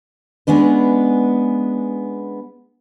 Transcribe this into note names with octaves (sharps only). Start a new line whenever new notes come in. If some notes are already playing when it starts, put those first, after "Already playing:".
G#3 B3 C#4 D4 B4